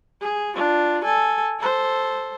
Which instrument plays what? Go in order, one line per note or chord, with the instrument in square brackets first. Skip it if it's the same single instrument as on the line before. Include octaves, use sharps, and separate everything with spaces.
[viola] G#4
D4 F4
A4 G#5
A4 C5